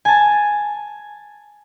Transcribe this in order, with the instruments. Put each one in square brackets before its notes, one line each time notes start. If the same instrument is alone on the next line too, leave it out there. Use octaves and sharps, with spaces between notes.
[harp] G#5 A5